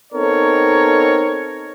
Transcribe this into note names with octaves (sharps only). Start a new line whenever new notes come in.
B3 C4 D#4 A4 A#4 C#5